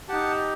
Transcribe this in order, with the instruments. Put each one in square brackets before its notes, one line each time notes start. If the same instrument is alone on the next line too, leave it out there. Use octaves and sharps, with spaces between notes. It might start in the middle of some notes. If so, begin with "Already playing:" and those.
[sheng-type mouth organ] D#4 G4 F#5 A5